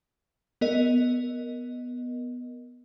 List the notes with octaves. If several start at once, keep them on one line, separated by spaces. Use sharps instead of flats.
B3 A#4 D#5